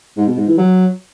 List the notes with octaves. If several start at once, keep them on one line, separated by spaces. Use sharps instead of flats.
G#2
B2
G#2
E3
F#3